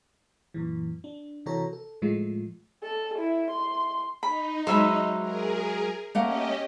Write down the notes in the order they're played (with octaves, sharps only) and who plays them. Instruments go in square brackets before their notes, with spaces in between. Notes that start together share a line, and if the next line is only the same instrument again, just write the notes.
[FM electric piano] F#2 A#2 E3
D4
C3 E3 F#4 A4 C#5 A#5
A4
A2 F3 G#3 A3 F4
[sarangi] A4
E4
C6
[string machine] D#4 [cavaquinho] B5
[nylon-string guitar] F#3 G#3 [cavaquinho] C5 E5 B5
[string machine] G#4 A#4
[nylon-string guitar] A3 A#3 F#5 [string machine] C#4 G4 D#5